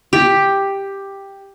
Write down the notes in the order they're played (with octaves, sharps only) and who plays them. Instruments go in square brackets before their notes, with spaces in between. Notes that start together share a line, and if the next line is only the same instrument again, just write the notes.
[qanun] G4